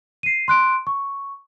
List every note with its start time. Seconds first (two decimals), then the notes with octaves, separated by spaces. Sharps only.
0.23 C7 D#7
0.48 C6 F#6 D7
0.87 C#6